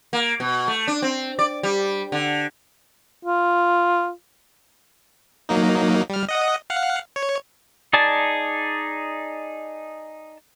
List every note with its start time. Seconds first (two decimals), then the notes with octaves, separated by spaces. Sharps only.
0.13 A#3
0.40 B2
0.68 A3
0.88 D4
1.02 C4
1.39 D5
1.63 G3
2.12 D3
3.25 F4
5.49 F#3 A#3 D#4
6.10 G3 F6
6.28 D#5 F#5 D#6
6.70 F5 F#5
7.16 C#5
7.93 D#4 G#4 D5 A5